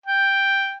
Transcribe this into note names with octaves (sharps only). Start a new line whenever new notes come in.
G5